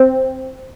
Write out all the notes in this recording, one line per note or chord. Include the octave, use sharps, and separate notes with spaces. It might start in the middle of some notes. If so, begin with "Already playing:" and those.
Already playing: C4